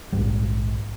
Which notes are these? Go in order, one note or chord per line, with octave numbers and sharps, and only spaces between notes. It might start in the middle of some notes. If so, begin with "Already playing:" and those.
A#1 G#2 G3